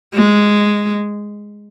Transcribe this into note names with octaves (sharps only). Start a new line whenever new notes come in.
G#3